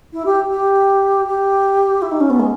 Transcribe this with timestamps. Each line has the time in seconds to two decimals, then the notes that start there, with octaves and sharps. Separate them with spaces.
0.13 E4
0.25 G4
0.50 G4
1.26 G4
2.01 E4
2.11 D#4
2.20 C#4
2.30 B3
2.39 G#3